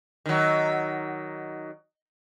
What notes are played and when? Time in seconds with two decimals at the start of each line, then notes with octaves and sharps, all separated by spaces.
0.26 D#3 F#3